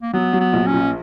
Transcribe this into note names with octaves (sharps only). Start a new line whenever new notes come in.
A#3
F#3 B3
F#3
B3
A#1
C#4
A#2